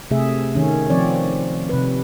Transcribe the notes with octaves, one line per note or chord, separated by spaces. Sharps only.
C3 A3 G#4 E5
D#3 C#4
F3 C4 C#5 D5
C3 B4